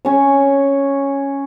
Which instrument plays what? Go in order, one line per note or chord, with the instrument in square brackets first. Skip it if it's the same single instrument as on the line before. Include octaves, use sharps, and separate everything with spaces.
[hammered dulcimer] C#4 C#5